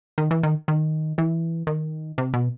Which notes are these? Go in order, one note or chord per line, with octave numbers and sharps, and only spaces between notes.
D#3
E3
D#3
D#3
E3
D#3
C3
B2